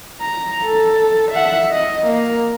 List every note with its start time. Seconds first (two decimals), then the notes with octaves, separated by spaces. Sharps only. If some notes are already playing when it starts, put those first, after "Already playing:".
0.21 A#5
0.65 A4
1.32 E5 F#5
1.72 D#5
2.06 A#3